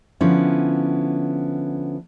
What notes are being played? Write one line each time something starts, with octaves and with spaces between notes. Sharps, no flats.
D3 F3 B3 C#4 E4